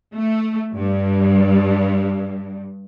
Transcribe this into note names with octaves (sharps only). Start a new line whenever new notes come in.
A3
G2